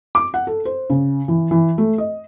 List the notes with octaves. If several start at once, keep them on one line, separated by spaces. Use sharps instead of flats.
D6
F#5
A4
C5
C#3
E3
E3
A3
D#5